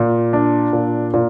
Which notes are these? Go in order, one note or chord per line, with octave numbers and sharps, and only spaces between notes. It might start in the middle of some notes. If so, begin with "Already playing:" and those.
Already playing: A#2
D4
A#2
A#2